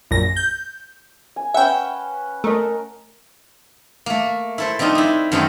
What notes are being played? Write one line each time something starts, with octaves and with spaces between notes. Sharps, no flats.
A#1 F#2 A#6
G6
G#5
C#4 B4 E5 F#5 G5
A3 A#4 D#5
A3 A#3
E4 A4 C5
F3 C4 D4 D#4 F4
D#4 E4
F#2 D#3 A3 C4 D#5 G5